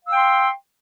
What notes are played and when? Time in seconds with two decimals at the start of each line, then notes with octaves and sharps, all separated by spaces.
0.04 F5
0.07 E6
0.11 G5
0.15 C6